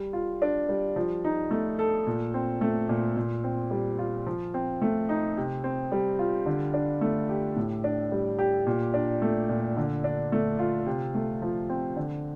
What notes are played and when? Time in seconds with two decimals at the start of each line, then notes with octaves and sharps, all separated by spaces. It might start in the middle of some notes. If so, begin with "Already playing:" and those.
Already playing: G3
0.13 F4
0.42 D4
0.69 G3
0.96 F3
1.24 D#4
1.51 A3
1.79 A4
2.07 A#2
2.34 C4
2.61 A3
2.89 A#2
3.17 A#2
3.44 C4
3.71 G3
3.99 F4
4.27 F3
4.54 C4
4.82 A3
5.09 D#4
5.37 C3
5.64 C4
5.92 G3
6.19 F4
6.46 D3
6.74 D4
7.01 A3
7.29 G4
7.56 A2
7.84 D4
8.12 G3
8.39 G4
8.67 A#2
8.94 D4
9.22 A3
9.49 A#2
9.77 D3
10.04 D4
10.32 A3
10.59 F4
10.86 C3
11.15 A3
11.42 F3
11.70 C4
11.96 D3